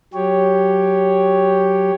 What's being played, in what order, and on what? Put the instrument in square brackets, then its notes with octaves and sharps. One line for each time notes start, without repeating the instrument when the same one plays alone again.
[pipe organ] F#3 G4 C#5